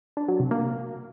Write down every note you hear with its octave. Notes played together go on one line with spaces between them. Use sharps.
D4
F#3
C3
A#3